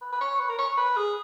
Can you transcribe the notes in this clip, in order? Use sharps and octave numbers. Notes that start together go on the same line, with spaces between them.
B4
B4
C#5
B4
A#4
C#5
B4
G#4